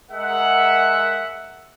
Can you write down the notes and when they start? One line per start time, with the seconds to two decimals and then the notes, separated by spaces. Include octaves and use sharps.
0.12 G#3 A#4 E5 F#5